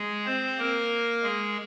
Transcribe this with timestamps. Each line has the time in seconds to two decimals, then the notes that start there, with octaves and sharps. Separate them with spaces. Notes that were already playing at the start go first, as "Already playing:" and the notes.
Already playing: G#3 G#4
0.26 C4 C5
0.58 A#3 A#4
1.23 G#3 G#4